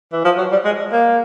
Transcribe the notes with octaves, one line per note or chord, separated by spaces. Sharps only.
E3
F3
F#3
G3
G#3
A#3